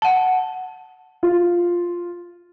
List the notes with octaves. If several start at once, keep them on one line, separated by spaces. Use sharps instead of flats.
F#5 A5
F4